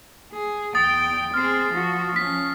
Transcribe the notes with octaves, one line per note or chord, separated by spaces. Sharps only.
G#4
E2 G5 D#6 A6
C4 G#4 F6 C7
F3 F#4
F3 C#4 B6